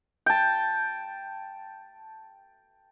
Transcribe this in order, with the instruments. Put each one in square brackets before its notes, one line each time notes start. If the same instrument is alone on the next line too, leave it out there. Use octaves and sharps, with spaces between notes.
[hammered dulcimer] G5 A5